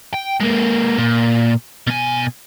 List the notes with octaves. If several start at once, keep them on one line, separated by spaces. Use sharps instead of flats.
G5
G#3 A#3
A#2
B2 G#5